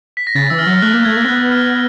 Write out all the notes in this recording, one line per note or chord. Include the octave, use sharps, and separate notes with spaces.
B6
A#6
C#3 A6
E3 E6
F6
F#3
F6
A3 F#6
A#3 G6
A3 G#6
A#3 G#6
C4
B3 F#6
F6